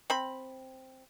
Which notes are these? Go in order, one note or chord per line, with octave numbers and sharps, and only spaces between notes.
C4 B5